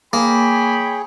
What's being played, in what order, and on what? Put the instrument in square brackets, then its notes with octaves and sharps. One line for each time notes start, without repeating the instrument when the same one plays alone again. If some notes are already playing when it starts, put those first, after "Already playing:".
[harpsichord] A#3 [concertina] G#4 [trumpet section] C#5 G5 B5